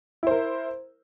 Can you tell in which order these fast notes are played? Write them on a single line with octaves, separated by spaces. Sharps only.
E4 C5 A#4